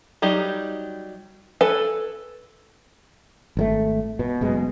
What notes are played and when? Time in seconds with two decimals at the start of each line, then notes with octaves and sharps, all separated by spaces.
0.22 F#3 G3 D#4 G4
1.61 A4 B4 G#5
3.57 G#1 D3 A3
4.19 B2
4.41 F#1 B2 G#3